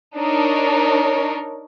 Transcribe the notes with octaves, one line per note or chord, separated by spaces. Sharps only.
D4 D#4 A#4 C#5